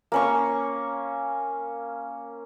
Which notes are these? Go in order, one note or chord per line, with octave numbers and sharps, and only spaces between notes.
A#3 C#4 C#6